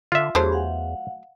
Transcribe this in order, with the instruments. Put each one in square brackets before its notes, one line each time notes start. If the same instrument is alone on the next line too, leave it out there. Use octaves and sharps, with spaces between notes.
[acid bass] D3 [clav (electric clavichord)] F4 E5
[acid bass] E2 [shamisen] F#3 A3 C5 [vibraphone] D4 G4 G#4
[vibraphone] F5 F#5